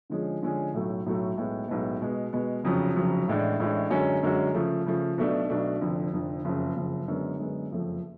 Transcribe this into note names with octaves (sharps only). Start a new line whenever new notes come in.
D3 F3 G#3 C#4 G#4
D3 F3 G#3 C#4 G#4
B1 A2 F#3 A3
B1 A2 F#3 A3
B1 A2 G#3 B3
B1 A2 G#3 B3
B2 G#3 B3
B2 G#3 B3
F1 F2 C#3 F#3
F1 F2 C#3 F#3
A1 A2 G#3 D4
A1 A2 G#3 D4
F#2 D3 G#3 C#4 F#4
F#2 D3 G#3 C#4 F#4
C#3 F3 A3
C#3 F3 A3
B1 B2 A3 D4
B1 B2 A3 D4
F1 F2 D3
F1 F2 D3
F#1 F2 C#3
F#1 F2 C#3
F#2 D3 G#3 B3
F#2 D3 G#3 B3
F#1 F2 F3 A3